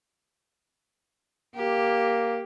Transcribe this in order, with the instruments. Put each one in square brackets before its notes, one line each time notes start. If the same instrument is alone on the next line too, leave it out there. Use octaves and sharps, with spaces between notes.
[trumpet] A#3 [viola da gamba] G4